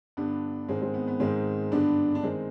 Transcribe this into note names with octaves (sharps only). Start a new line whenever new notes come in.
G2 D3 B3 D4
G#2 D#3 G#3 C4
G#3 C4
B3
B3
G#2 D#3 G#3 C4
G2 D3 B3 D4
D4
D#3 G#3 C4